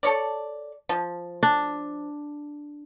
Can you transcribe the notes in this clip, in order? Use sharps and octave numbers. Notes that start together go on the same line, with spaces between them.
A4 C#5 D5
F3
D4